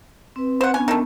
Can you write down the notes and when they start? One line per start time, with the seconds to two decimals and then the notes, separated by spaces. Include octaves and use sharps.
0.36 C4 B4
0.61 C5 F#5
0.74 B3 C#4 D4 G#5
0.88 D#3 A3